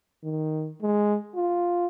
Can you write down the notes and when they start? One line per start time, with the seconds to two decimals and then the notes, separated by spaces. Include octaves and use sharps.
0.24 D#3
0.82 G#3
1.35 F4